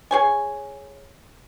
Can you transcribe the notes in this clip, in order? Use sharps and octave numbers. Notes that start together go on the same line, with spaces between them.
G#4 C#5 G#5